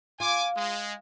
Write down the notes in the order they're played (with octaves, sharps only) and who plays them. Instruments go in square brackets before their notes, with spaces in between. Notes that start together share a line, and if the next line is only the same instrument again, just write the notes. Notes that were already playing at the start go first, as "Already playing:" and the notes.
[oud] F4 [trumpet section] G#5 D6
[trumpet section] G#3